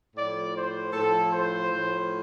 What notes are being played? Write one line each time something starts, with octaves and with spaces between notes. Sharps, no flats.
A2 F3 D5
C5
A2 F3 A4
C5
A2 F3